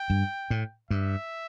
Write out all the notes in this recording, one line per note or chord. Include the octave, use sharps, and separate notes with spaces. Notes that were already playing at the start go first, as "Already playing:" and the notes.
Already playing: G5
G2
A2
G2 E5